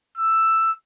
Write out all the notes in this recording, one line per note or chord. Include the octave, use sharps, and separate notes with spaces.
E6